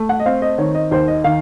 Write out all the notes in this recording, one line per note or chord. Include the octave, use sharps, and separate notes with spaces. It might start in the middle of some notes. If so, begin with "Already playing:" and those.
Already playing: A3
F#5
D#5
C4 F5
D#5
D#3 C#5
D#5
D#2 C5
D#5
D#3 F5